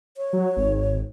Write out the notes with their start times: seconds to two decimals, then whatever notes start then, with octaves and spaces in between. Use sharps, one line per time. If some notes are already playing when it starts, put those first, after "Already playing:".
0.17 C#5
0.33 F#3
0.57 G#1